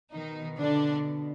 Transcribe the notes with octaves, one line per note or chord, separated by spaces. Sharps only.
B2 D#3 D#4
D3 D4